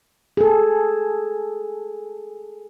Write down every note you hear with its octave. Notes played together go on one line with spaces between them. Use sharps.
G#4 A4